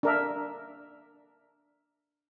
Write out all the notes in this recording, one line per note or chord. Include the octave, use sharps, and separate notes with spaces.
D4 A#4 E5